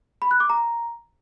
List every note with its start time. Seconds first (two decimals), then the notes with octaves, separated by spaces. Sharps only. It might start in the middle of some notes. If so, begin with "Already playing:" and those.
0.22 B5
0.31 F#6
0.40 D6
0.50 A#5